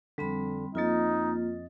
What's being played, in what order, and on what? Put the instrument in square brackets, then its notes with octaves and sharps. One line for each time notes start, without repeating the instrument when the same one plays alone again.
[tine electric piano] F2 D3 [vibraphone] G3 C4 B5
[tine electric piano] F2 D#5 A6 [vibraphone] A#3 F4 [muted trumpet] D#4